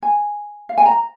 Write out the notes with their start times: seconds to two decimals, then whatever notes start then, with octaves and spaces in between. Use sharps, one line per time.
0.03 G#5
0.69 F5
0.78 G#5
0.86 A#5